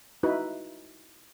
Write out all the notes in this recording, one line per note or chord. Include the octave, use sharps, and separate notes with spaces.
D#4 E4 F#4 B4 E5